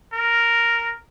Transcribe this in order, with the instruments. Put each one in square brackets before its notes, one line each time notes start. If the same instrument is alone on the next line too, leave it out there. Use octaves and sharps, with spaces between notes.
[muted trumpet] A#4